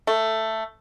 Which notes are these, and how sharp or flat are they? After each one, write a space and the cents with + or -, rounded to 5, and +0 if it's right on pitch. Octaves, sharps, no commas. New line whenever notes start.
A3 +10